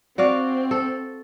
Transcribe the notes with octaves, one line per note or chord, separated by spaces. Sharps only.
C4 F#4 D5 F5
A4